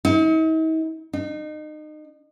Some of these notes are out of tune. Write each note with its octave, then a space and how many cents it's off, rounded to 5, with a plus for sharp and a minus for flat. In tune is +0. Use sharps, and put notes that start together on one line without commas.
D#4 +45
D#4 -30